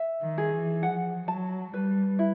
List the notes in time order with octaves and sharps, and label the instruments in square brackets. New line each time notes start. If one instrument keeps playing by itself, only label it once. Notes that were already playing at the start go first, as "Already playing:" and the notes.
Already playing: [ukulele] E5
[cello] D#3
[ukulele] G#4
[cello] E3
[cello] F3 [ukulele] F#5
[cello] F#3 [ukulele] A5
[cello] G3 [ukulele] B4
[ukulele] E4